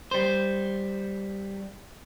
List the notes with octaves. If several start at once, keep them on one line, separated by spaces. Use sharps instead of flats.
G3 C5